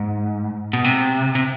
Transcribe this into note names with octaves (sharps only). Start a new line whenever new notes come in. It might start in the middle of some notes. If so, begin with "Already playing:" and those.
Already playing: G#2
B2
C3
C3